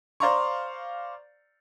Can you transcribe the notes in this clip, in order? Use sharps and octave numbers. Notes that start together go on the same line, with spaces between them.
C5 D5 F5 A#5 C6 C#6